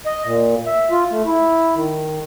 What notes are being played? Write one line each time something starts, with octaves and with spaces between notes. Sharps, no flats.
D#5
A#2
E5
F4
A3
E4
D#3